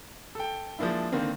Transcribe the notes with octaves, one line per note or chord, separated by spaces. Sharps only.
A4 G5
F3 G#3 A#3 D4 E4
D3 D#3 A#3 C4